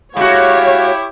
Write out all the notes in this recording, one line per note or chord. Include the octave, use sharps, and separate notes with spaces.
G#3 E4 F#4 G4 C#5 F5